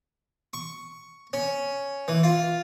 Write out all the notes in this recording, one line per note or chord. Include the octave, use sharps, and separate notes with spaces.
C#6
C#4
E3
F4